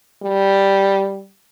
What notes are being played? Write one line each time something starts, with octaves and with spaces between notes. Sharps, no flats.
G3